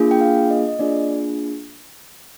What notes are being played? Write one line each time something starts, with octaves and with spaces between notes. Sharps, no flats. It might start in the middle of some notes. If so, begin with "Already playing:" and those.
Already playing: A#3 D4 F4 G#4
G5
F5
D#5
D#5
A#3 D4 F4 G#4 D5